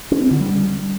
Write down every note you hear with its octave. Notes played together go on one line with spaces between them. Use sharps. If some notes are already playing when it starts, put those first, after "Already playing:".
C#4
C4
D3
G3